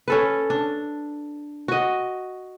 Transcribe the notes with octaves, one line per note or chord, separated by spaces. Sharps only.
C#4 A4 B4
D4
F#4 D#5